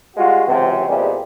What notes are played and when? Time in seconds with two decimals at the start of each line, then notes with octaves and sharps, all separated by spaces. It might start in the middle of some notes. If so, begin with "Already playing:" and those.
0.17 G3 G#3 F4 F#4
0.47 C#2 C3 E3 F#3 C4
0.88 E2 A#2 E3 G3 G#3 C4